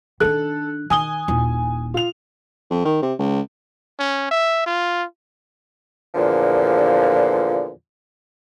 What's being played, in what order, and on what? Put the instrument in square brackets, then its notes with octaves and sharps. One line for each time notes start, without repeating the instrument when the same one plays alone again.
[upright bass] D#3 D4 [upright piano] A4 F#6
[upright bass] D#3 [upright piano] G#5 D#6 G7
[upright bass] D#1 E4
[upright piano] F4 F7
[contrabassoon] F2
D#3
C3
C#2
[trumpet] C#4
E5
F4
[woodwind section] E2 A#2 D3 F3